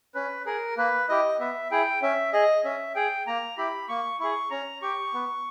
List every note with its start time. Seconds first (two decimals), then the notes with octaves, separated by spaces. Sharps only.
0.15 C#4 B4
0.46 G#4 A#4
0.77 A#3 B4
1.09 E4 G4 D#5
1.40 B3 E5
1.71 E4 G#4 G5
2.02 C#4 E5
2.33 G#4 D#5
2.64 C#4 E5
2.95 G#4 G5
3.27 A#3 A#5
3.58 E4 G4 B5
3.89 A#3 C#6
4.20 E4 G#4 C#6
4.51 C#4 A#5
4.82 G4 C#6
5.14 B3